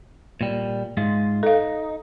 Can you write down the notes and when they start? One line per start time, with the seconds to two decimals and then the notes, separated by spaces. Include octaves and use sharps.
0.41 A#2 G3
0.97 G#2 G#3 F4
1.43 D#4 A4 F5